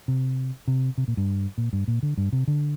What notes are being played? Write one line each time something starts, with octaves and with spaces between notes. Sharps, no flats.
C3
C3
C3
A#2
G2
A#2
G2
A#2
D3
G2
C3
D3